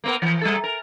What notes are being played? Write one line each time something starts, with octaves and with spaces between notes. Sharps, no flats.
A#3 B3 A#4
E3
G3 G#4 A4
A#4